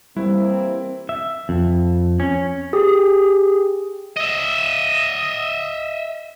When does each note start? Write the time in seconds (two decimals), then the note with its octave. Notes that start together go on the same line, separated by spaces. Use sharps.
0.17 E3 G3 A#3 C4 E4
1.09 E5
1.49 F2
2.20 C#4
2.73 G4 G#4 D#6
4.17 D#5 E5